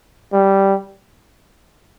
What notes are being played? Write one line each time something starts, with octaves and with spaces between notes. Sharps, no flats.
G3